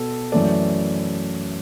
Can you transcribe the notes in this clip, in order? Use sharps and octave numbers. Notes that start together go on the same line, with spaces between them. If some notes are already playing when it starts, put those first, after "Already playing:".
Already playing: B2 B3 A4
F#2 E3 A3 D5